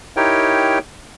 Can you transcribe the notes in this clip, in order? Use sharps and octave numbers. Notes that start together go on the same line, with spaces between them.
D#4 E4 G4 A#4 C#5 G5